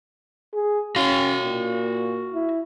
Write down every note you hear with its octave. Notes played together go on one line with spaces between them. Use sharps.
G#4
C#4 F#4 F5
A#2
E4